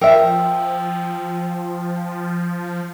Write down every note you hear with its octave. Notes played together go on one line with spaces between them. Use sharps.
F3 A#4 E5 G5 E6